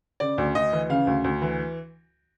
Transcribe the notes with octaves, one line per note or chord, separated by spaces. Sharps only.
C#3 D5
D2
D2 D#5
E3
C#3 F5
D2
D2
E3